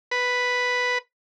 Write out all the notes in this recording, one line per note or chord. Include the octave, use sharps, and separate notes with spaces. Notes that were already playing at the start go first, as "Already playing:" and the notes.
B4